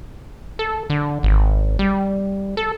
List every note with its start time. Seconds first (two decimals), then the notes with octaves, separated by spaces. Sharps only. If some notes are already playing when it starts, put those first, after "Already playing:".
0.59 A4
0.90 D3
1.23 G#1
1.79 G3
2.57 A4